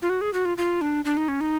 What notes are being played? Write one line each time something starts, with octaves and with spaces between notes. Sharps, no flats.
F4
F#4
G#4
F#4
F4
F4
D4
D4
D#4
C#4
D#4